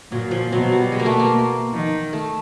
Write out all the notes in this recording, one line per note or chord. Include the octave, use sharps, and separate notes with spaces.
A#2 F#3
F3
B2 F#3
G3
G#3
A#3
A3
A#3
D#3
A3